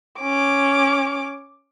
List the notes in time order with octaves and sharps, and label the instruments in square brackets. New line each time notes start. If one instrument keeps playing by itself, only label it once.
[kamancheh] C#4 D6